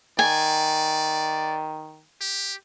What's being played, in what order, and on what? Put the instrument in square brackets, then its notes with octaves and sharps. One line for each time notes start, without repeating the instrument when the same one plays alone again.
[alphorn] D#3 [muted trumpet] D5 [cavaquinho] G#5
[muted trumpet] G4